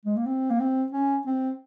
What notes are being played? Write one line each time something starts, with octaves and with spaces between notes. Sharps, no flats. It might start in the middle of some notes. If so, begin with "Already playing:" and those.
G#3
A#3
C4
A#3
C4
C#4
C4